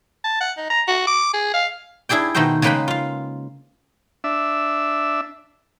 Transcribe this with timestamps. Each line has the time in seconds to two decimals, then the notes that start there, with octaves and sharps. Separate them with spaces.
0.24 A5
0.41 F#5
0.58 D#4
0.70 A#5
0.88 F#4
1.07 D6
1.34 G#4
1.54 F5
2.09 D4 E4 G#4 D5 G5
2.34 B2 D#3 A3 D#4 C5 G5
2.62 C#3 G#3 A#3 B4 G5 B5
2.88 F4 F5
4.24 D4 E5